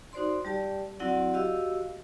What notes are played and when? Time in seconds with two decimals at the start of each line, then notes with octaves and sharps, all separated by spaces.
0.13 D#4 F#4 C5 D5 C6
0.45 G3 G4 D5 A5
1.00 F#3 C4 E4 F#4 D5 F#5
1.34 F#4 G4 D#5 F5 E6